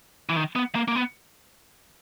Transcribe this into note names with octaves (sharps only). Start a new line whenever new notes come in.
E3
D#3
B3
A#3
A#3
B3